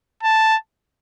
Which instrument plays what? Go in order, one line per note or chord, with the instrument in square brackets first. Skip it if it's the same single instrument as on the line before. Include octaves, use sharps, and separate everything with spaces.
[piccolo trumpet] A5